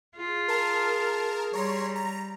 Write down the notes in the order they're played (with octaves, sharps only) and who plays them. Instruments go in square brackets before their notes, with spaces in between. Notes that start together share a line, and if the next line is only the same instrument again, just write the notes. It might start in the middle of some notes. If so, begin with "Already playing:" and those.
[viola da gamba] F4 [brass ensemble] G#4
[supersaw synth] A#4 A5 F6
[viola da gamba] G3 [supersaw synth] C#5 A#5 C6
[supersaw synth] A#5